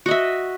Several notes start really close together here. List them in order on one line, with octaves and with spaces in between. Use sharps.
F#4 D#5 E5